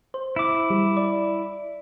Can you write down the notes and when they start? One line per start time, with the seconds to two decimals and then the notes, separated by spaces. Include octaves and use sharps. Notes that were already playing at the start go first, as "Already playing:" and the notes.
0.14 C5
0.36 E4 D6
0.70 G3
0.97 D5